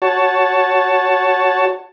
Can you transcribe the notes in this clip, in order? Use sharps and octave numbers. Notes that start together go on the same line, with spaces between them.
F#4 C#5 A5